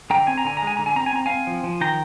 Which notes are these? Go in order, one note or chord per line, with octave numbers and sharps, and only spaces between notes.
D3 G5 A#5
C4 G#5
A#5
D3 G#5
A#5
G#3
G#5
D3 A#5
G#5
C4 A#5
G#5
C4 A#5
C4 F5 G#5
F3
F3
D#3 G5 A#5